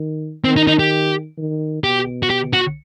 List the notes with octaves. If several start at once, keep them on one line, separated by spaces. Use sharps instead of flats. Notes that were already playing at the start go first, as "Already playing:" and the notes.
Already playing: D#3
D#3 C4
D#4
D#4
G4
D#3
B2 G4
F#4
G4
F#4